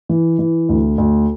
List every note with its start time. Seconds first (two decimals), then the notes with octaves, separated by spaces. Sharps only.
0.09 E3
0.39 E3
0.69 D2
0.98 D2